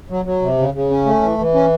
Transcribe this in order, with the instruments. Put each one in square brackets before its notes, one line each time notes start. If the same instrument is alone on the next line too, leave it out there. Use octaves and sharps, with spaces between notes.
[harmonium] F#3
F#3
C3
C#3
C#3
C#4
A3
E3
E3
C#4